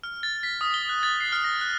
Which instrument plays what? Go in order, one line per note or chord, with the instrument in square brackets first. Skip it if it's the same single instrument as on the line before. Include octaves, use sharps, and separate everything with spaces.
[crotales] F6
A6
B6
D#6
G7
F#6
A6
C7
F6
A#6
F#6